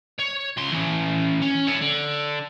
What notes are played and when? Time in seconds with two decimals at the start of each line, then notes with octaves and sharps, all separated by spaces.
0.19 C#5
0.57 C#2 C6
0.72 E3 C#4
1.42 C#4
1.68 C#5 E5
1.82 D3